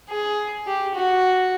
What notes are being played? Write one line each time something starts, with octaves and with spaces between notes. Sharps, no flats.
G#4
G4
F#4